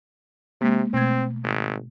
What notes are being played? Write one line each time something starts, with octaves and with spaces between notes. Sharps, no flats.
C3 G#3 A#3
B2 A3 C4 G#6
G#1